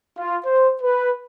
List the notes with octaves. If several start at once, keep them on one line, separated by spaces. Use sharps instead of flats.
F4
C5
B4